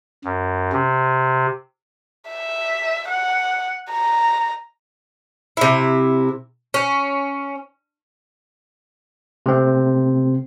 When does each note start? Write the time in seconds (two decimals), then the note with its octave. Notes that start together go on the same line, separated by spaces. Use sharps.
0.25 F#2
0.73 C3
2.31 E5
3.09 F#5
3.91 A#5
5.57 C3 E4
6.74 C#4
9.46 C3 A3 C4